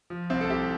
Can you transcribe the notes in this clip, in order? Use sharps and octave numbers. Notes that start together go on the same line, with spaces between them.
F3
C2 C4
A4
C2 G4